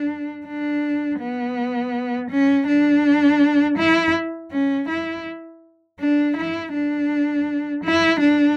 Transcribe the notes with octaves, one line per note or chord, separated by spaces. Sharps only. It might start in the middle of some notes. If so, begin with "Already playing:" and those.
Already playing: D4
D4
B3
C#4
D4
E4
C#4
E4
D4
E4
D4
E4
D4